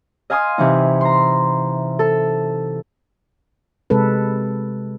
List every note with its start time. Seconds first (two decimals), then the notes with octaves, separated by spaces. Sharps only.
0.30 D#5 F5 G#5 C6 D#6
0.58 C3 E3 D#4
1.01 A#5 C6
1.99 A4
3.90 C3 G#3 C4 A4 B4